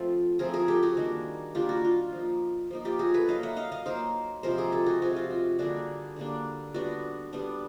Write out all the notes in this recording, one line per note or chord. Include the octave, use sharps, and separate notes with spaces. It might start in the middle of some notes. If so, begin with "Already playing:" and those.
Already playing: F3 A3 C4
F3 A3 C4 G#4 A#4
G#4 A#4
G4 A4
F#4 G#4
D#3 G3 A#3 D4
D#3 G3 A#3 D4 F4 G4
F#4
F4
F3 A#3 D#4
F3 A#3 D#4
F4 G4
F#4 G#4
A4 B4
F#3 A#3 D#4 D#5 F5
E5 F#5
D#5 F5
D#5 F5
F#3 A#3 D#4 A#4 C5
C3 F3 G#3 A#4 C5
G#4 A#4
G4 A4
F#4 G#4
C3 F3 G#3 F#4
F4
F#4
D3 G3 A#3 D4 F#4 G#4
D3 G3 A#3 D4
G3 B3 D4 F#4
G3 B3 D4